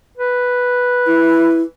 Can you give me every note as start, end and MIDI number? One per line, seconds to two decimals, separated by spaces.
0.18 1.67 71
1.07 1.62 64